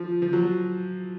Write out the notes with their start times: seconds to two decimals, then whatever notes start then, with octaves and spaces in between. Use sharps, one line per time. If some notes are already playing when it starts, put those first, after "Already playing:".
Already playing: F3
0.22 F3
0.33 F#3